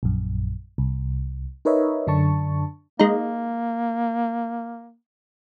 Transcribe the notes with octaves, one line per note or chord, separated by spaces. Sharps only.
A#1 F#2
C2
D#4 A#4 B4 C#5 D#5 E5
F#2 D3 D4 A5 C#6
G#3 A#3 D#4